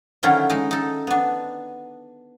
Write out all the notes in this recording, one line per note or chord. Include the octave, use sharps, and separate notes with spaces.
D3 D#3 F#3 C#4 E4 F4
G#3 D#4
D#4 A4
B3 D4